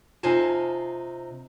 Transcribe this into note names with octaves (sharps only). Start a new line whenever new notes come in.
C3 D#4 F4 C5 G#5 A5